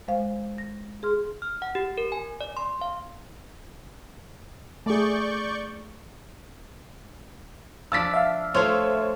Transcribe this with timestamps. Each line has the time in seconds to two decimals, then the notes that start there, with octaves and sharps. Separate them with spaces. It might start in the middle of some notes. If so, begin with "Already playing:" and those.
0.08 G#3 C5 F5
0.58 A#6
1.03 G#4 C6 F6
1.42 F6
1.62 F#5
1.75 G4
1.98 A#4
2.12 G#5
2.41 D5
2.57 C6
2.81 F5
4.86 A3 G#4 D5 C#6 G6
7.92 F3 D4 E6 A6 B6
8.14 E5 F5
8.54 A3 F4 C5 C#5